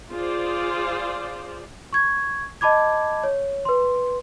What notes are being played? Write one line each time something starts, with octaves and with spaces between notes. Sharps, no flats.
F4 G#4 C5 D5
C#6 G#6
D#5 A5 B5 D6 G#6
C#5
B4 C6